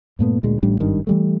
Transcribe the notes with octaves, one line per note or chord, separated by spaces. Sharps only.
G2 A#2 A3 B3
D2 A#2 G#3
A1 A2 G3 D4
G#1 G2 D#3
E3 G3 A3